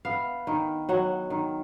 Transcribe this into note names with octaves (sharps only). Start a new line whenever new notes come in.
B3 F5
D#3
F#3 F#5
D#3